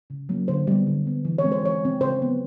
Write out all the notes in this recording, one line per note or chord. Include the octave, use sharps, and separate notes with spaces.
C#3
F#3 A#3 C#4
D3 C5
G3 B3
D3
G3 B3
E3
C#5
G#3 C4
C5
E3 C#5
G#3 C4
C#3 C5
F#3 B3